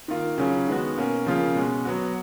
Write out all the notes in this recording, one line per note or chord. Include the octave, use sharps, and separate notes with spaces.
D#3 A#3 F4
C#3 F#3 C#4 F4
D#3 G#3 B3 F#4
B2 A#3 C#4
C#3 F3 A#3 C#4 F4
B2 G#3 C#4
F#3 B3 F#4